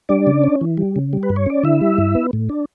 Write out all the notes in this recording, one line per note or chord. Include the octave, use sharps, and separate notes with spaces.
G3 D4 D5
C#3
C#4
E3
G3
C#3
G3
B4
G2
C#5
C#4 D5
D3 E4 E5
G3
G2
B3
A2
D4